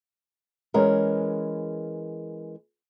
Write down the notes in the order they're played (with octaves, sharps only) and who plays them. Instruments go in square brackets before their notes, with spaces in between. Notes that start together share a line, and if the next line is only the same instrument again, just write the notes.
[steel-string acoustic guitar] E3 G#3 C#4 A#4